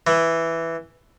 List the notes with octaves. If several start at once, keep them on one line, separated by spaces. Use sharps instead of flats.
E3